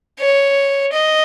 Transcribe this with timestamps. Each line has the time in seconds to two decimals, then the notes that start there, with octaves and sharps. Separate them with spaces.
0.19 C#5
0.92 D#5